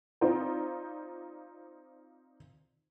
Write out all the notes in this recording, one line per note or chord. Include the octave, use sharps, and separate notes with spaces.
C4 D#4 F4 C5 D5